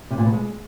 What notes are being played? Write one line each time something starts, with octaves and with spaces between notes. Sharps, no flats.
C3
A#2
B2
G#3